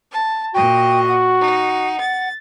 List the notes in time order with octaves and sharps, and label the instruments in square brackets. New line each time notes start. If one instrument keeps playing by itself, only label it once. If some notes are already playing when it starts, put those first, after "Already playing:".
[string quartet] A5
[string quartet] A#2 D#5 [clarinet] F#4 [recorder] G5
[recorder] F#5
[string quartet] D#4
A6